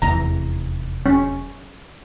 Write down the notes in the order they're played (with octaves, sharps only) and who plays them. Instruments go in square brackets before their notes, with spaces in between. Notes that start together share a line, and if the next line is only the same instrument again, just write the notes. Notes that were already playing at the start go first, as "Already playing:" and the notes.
[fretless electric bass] F1 E2 E3 [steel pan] A#5
[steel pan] C#4